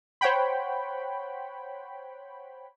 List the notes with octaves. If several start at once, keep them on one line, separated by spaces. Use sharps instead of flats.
C5 C#5 F#5 G5 B5